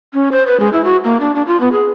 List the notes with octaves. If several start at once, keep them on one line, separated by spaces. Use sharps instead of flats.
C#4
C5
B4
G#3
E4
F#4
A#3
D4
D4
F4
B3
G#4